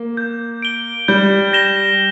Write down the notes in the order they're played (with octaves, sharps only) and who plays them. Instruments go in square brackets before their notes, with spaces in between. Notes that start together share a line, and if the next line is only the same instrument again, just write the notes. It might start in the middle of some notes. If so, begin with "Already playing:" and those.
Already playing: [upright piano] A#3
[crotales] G6
D7 G7
[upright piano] G3 [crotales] G6
[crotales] A#6 E7 G7